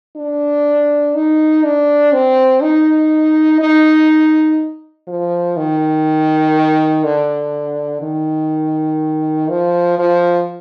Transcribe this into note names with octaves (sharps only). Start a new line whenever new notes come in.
D4
D#4
D4
C4
D#4
D#4
F3
D#3
D3
D#3
F3
F3